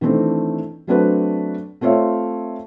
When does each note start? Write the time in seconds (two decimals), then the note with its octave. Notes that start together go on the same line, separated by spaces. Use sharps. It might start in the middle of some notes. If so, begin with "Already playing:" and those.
0.01 D#3 E3 A3 C4 D4
0.87 F#3 A3 C4 D4 F#4 B4
1.81 A3 C4 F4 C#5 E5